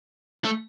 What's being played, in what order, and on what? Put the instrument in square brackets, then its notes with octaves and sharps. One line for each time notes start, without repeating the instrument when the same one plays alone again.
[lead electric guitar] A3